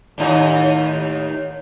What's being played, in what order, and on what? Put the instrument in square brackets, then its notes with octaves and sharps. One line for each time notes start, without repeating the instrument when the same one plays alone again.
[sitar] D#2 A2 D#4